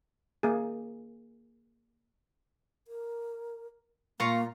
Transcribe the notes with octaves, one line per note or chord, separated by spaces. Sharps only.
A#3 G#4
A#4
A#2 A#3 F4 F5 A#5 C#6